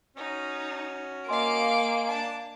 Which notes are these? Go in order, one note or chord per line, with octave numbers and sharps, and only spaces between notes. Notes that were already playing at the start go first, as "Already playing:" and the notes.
C#4 D#4 F#4
A#3 D#5 F5 G#5 C6 D6 D7
D4 A5